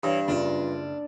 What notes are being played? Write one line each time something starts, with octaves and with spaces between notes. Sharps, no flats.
G2 E3 C#5
F#1 D4 F4